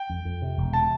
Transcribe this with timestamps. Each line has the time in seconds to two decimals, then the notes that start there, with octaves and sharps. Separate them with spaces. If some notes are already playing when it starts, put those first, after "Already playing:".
Already playing: G5
0.10 F2
0.25 F2
0.42 C3
0.58 E1
0.73 C3 A5